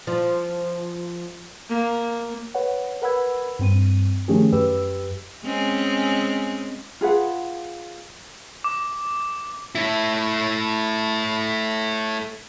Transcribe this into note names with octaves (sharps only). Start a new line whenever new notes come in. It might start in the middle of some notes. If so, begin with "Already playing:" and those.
F3
A#3
B4 C#5 F#5
A#4 B4 F#5 B5 E6 G#6
G2 C4 D#7
D#3 F3 A3 C#4 G4 G#4
F#2 G4 B4 E6
G#3 C4 C#4
F4 G#4 B4 F#5
D6
A3 E4